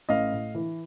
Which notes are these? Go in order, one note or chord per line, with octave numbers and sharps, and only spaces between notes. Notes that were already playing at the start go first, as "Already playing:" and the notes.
A1 D#5 F5
A2
E3